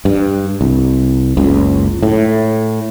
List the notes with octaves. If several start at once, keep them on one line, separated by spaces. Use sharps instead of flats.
G2
C2
F#1 C#2
A2